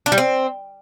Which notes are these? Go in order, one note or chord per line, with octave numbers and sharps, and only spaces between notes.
D4
G3
C4